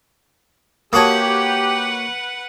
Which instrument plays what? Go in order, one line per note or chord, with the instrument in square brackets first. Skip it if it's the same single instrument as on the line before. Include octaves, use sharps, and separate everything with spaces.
[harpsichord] A#3 F#4 C#5 [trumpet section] G4 [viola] B4 F#5 [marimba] A5 D#6